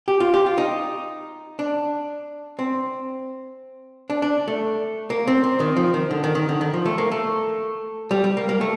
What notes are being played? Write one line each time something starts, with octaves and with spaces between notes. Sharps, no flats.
G4
F4
G4
F4
D#4
D4
C4
D4
D4
A3
A#3
C4
C4
D#3
F3
D#3
D3
D#3
D#3
D3
D#3
F3
A3
A#3
A3
G3
G3
A#3
A#3
A3